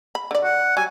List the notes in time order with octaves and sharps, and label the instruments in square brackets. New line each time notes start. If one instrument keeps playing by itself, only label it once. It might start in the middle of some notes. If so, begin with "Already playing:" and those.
[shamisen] B5
D3 D5
[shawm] F#5
[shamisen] F#3 G3 [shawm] G#5